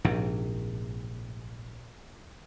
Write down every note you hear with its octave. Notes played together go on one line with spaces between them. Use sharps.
A#1 G#2 C3